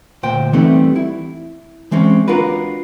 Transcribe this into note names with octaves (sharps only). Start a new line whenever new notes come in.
D2 A#2 C5 G5
E3 G3 A3 B3 C4 D#4
E4
E3 G#3 C4 C#4
D4 F4 F#4 A#4 B4